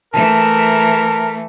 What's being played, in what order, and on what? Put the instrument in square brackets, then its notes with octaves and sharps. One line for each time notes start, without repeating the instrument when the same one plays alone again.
[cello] E3 A3 [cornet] A#4 [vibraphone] A5